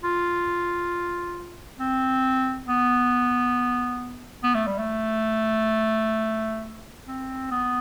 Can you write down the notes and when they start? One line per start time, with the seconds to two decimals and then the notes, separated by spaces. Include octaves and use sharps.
0.03 F4
1.79 C4
2.67 B3
4.43 B3
4.55 A3
4.67 G3
4.79 A3
7.07 C4
7.51 B3